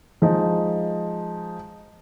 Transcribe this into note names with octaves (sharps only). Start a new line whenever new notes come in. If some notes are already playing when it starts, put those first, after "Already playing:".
F3 G#3 D#4